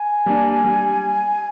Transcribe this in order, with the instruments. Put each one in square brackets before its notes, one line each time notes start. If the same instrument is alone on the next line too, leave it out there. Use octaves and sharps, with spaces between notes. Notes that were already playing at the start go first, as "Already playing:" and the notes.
Already playing: [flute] G#5
[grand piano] G3 A#3 D4
G3